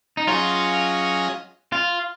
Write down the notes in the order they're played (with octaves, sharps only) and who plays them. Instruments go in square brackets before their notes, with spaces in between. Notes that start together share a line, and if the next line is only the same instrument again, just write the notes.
[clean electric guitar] D#4
[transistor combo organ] F#3 C#4 G#4 D#5 [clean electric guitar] F4
[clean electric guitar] F4